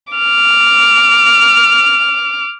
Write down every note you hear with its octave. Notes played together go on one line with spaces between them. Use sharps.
D6 F6